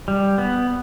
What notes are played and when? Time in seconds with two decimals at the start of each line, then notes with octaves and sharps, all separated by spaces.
0.08 G3
0.38 B3